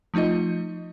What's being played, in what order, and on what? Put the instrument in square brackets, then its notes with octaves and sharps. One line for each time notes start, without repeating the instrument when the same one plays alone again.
[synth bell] F3 A3 D#4 F4 D#5